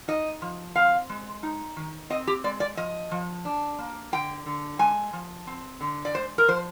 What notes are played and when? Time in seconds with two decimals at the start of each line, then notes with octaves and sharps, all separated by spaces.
0.08 D#4 D#5
0.42 F3
0.75 C4 F5
1.09 G#3
1.43 D#4
1.77 D#3
2.10 C4 D#5
2.27 G4
2.44 G#3 D5
2.60 D5
2.77 F3 D#5
3.11 F3
3.45 D4
3.79 A#3
4.12 D3 G5
4.46 D3
4.79 G#3 G#5
5.13 F3
5.47 C4
5.81 D3
6.05 D5
6.14 G#3 C5
6.38 A#4
6.48 F3 C5